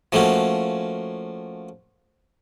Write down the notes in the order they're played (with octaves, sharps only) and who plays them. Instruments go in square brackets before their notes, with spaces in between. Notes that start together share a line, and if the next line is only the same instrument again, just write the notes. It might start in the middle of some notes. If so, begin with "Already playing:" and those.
[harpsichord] F3 A3 A#3 C#4 F#4